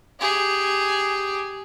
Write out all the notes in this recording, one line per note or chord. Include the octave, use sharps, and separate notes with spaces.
G4 G#4